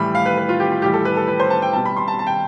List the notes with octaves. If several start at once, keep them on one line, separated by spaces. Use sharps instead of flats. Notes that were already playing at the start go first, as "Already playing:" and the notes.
Already playing: A2 E3 G3 B5
F5
B4
B4
F4
G4
F4
A2 E3 G3 G4
A4
B4
A4
B4
C5
A5
G5
B2 G3 A5
B5
C6
A5
A5
G5